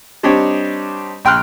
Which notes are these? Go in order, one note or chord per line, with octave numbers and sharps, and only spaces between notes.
G3 C4 D4 D#4 G4 C#5
A#1 G5 C6 F6 F#6